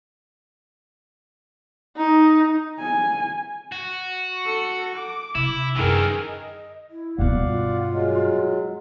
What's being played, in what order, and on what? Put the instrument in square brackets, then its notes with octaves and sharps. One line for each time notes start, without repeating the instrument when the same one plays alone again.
[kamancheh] D#4
[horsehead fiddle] G#5
[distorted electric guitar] F#4
[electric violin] A4 C#7
D6
[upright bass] C3 [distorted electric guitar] E4
[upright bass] F#2 C#4 [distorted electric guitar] D#3 E3 [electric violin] G#4 A#4
[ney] D#5
E4
[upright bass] G2 B2 [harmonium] D5 F5 F#5
[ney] F4
[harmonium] F#3 G#3